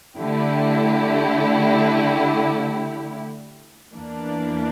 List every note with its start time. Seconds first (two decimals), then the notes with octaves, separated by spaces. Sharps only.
0.18 D3 A3 E4 G4
3.93 E2 E3 A#3 D4